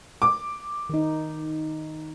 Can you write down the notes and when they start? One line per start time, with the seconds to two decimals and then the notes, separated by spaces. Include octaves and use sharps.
0.22 D6
0.89 D#3 D#4